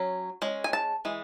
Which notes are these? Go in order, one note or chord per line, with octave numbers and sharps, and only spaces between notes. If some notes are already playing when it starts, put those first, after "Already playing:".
Already playing: F#3 C#4
G#3 C#4
G#5
A5
E3 G#3